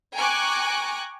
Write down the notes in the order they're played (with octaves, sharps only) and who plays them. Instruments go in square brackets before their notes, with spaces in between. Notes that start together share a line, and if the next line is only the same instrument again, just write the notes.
[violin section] G5 G#5 A#5 C#6 D6 F#6